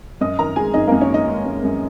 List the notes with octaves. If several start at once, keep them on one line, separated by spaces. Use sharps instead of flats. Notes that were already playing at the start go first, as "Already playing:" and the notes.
F#2 D#5 D#6
D#3 A#4 A#5
G#3 G#4 G#5
F#2 D#4 D#5
A#3 A#4
F#2
C#4 C#5
D#3 D#4 D#5
G#3
F#2
F#2